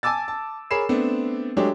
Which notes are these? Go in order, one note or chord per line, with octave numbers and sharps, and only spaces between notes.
G#5 A5 D6 E6 A6
A5
G#4 A#4 C#5 B5 C7 E7
A3 B3 C4 D4
F#3 G#3 A3 D4 G4 C#5